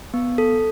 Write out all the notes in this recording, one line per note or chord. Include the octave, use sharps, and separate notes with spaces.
B3
A4